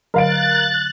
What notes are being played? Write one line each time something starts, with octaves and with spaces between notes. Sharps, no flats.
D3 F#3 A#4 F5 F#6 A6 D7